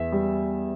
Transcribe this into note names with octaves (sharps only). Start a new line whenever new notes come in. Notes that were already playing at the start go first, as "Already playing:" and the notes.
Already playing: E2 E5
G3